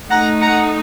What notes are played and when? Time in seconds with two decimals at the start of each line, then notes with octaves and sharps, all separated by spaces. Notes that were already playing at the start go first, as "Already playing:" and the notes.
0.10 A3 D#4 F#5 A#5
0.41 F#5 A#5